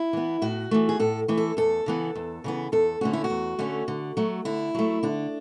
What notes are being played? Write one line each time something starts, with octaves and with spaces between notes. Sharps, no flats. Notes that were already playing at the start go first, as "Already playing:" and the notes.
Already playing: E4
E3 B3
A2 F#4
E3 A3
G#4
A2 A4
E3 A3
A4
E2 A4
C#3 E3 B3
E2
C#3 E3 B3
E2 A4
D3 A3 C#4 F#4
E4
F#4
E2
D3 A3 C#4
D3
F#3 A3
D3 E4
F#3 A3
D3 D4